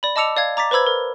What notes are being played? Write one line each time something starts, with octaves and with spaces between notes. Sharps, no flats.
D5 B5
D#5 A5 D6 E6 C#7 F7
D5 F5 G#6
A#5 D6 A6 B6
B4 C5 B5 E6 G#6
A#4